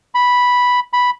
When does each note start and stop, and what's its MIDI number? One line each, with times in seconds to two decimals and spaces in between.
0.15 0.80 83
0.93 1.10 83